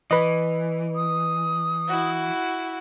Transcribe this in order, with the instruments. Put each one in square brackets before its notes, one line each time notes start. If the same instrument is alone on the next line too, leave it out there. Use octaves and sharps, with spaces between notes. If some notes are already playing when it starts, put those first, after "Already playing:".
[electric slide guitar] E3 [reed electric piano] B4 D#5
[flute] D#6
[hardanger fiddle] E4 F#4